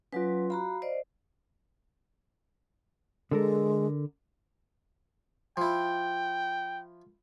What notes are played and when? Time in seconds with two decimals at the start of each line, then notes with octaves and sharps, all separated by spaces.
0.12 F#3 C#4 F4 B4
0.50 F#4 F5 A#5 B5
0.82 C5 D5 D#5
3.31 D3 G#3 A4 A#4
5.57 F3 E4 G5